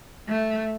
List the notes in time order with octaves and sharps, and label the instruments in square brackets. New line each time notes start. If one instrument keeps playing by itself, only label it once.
[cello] A3